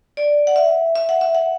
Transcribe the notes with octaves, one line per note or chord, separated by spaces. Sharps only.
D5
F#5
E5
E5
F#5
E5
F#5